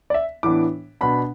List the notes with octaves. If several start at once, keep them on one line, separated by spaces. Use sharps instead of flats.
D5
E5
A2 E3 B3 D4 D6
B2 B3 D4 B5